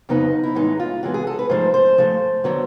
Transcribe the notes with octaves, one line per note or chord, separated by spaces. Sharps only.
F2 C#3 F#3 B3 D#4
E4
A2 E3 G#3 B3 D#4
F4
A2 E3 G#3 B3 F#4
G#4
A4
B4
G#2 F3 A3 C5
C5
G#2 F3 A3
D3 F#3 B3